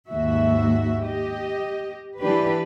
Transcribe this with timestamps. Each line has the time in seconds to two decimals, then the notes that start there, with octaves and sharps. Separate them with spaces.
0.10 D#2 G#2 F#4 E5
1.03 G4 D#5
2.20 E3 D4 G4 B4